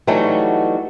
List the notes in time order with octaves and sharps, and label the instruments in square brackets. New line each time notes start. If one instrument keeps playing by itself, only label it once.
[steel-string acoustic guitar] E3 F#3 G3 A3 D#4 F#4